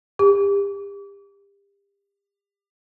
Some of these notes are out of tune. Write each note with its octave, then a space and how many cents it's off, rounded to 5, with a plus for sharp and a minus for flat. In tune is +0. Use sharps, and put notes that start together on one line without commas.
G4 +35